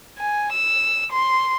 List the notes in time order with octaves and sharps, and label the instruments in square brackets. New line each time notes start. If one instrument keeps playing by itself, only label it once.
[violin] G#5
E6
C6